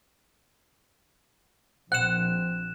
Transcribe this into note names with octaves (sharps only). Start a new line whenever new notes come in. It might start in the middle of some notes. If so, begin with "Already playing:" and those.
A#1 C4 F#5 F#6 E7